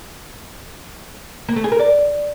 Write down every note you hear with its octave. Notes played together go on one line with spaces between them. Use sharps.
A#3
A3
G#4
A#4
D5